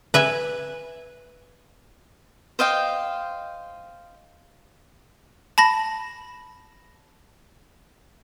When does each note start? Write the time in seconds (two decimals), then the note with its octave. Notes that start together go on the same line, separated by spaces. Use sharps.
0.14 B4 E5 G#5
2.59 C5 D#5 F5 G5
5.58 A5 B5 A#6